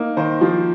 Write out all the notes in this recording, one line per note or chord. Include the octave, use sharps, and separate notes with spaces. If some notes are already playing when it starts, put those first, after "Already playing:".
Already playing: A#3 D#4
D#3 C5
F3